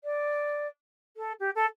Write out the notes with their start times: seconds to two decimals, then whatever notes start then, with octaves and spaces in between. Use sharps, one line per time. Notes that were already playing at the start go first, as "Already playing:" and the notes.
0.04 D5
1.17 A4
1.39 G4
1.55 A4